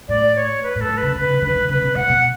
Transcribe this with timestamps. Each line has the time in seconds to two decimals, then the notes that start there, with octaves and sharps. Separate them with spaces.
0.08 A2 D5
0.35 C#5
0.62 B4
0.76 A2
0.80 A4
0.89 A2
0.97 B4
1.02 C#3
1.15 C#3 B4
1.29 C#3
1.42 D3 B4
1.55 D3
1.69 C#3 B4
1.82 B2
1.95 B2 F#5
2.09 B2